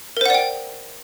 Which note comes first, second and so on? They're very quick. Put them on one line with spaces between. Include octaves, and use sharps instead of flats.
A#4 C5 F#5 D5 G5